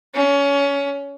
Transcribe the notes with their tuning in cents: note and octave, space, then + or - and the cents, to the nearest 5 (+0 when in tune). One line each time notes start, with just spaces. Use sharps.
C#4 +25